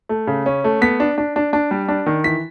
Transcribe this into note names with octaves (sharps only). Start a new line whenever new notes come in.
A3
C#3
C#4
A3
B3 B6
D4
D4
D4
D4
G3
D4
D#3
E3 B6